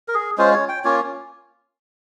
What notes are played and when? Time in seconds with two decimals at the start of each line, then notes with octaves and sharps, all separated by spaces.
0.08 A#4
0.14 G#4
0.38 G#3 C#4 F4 C5
0.54 C#5
0.69 G5
0.84 A#3 C#4 F4 C#5